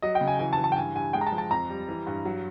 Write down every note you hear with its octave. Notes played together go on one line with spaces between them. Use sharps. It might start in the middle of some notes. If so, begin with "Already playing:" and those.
F#3 D#5
G5
C#3
G#5
E3 G#5
A5
E3
A5
G5
G2 G#5
G2 G#5
G#3 G5
A#5
A5
F3
A5
F2 A#5
G3
E3
G2
F#3